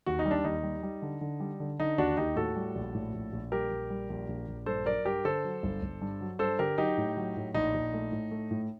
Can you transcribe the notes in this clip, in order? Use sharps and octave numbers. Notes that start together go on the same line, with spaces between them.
D#2 F#4
D#4
G3
D4
D#2 D#4
G3
G3
D3
D3
G3
D3
D3 D#4
D#2 D4 F#4
D#2 D#4 G4
A2 F#4 A4
G3
A#1
A2
A#1
A#1
G3 G4 A#4
A#1
G3
A#1
A#1
A#1
G2 A4 C5
F#3 A#4 D5
G2 G4 A#4
D3 A4 C5
F#3
G1
G1
G2
F#3
G2 A4 C5
D3 G4 A#4
F#3 D#4 G4
A2
F#3
A2
A#1 D#4
A#1
A3
A2
A3
A2